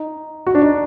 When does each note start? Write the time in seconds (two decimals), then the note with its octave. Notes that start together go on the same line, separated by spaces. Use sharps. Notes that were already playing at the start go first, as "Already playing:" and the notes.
Already playing: D#4
0.47 F#4
0.55 D4
0.62 D#4